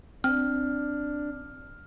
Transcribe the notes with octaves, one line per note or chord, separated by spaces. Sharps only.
C4 D4 F6